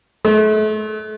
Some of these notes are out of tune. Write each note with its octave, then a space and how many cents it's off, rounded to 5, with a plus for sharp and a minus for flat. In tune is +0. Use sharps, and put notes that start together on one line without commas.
A3 -40